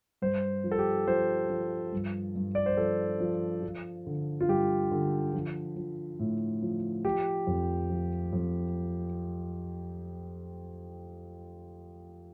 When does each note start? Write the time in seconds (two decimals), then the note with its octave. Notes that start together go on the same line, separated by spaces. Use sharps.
0.22 G2 C5
0.64 F3
0.72 A4
0.79 G4
1.08 F3 C5
1.50 F3
1.92 G2
2.36 G2
2.55 D5
2.66 C5
2.77 F3 A4
3.20 F3
3.63 F3
4.07 D3
4.41 F4
4.48 G2 G4
4.91 D3
5.33 F3
5.77 F3
6.19 A2
6.62 F3
7.04 F3 G4
7.47 F2
7.90 F3
8.33 F2